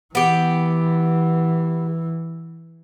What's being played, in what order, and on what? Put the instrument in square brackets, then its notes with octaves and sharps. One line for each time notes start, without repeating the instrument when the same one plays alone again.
[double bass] E3 [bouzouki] B3 G4